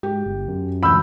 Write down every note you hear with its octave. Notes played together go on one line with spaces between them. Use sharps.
G#2 G4
G1
F#2
E1 D2 B5 E6 G6